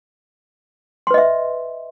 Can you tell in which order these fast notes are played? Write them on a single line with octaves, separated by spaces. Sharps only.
C6 B4 D#5 E5